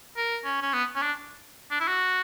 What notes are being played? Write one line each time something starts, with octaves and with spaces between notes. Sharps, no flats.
A#4
C#4
C#4
B3
C#4
D4
D4
E4
F#4